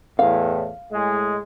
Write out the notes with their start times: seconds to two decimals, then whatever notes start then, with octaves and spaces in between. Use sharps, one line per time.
0.19 E2 A2 F5
0.91 A2 G#3